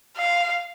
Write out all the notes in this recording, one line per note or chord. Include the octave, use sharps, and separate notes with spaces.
F5